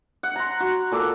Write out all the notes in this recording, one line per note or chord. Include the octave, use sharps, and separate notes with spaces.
F#5
A#5 C6
F#4
A#2 A4 D6